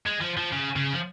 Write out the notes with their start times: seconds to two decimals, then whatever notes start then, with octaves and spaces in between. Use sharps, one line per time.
0.06 G#3
0.21 F3
0.37 F3
0.52 C#3
0.76 C#3
0.93 F3